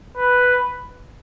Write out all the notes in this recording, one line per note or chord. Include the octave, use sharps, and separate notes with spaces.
B4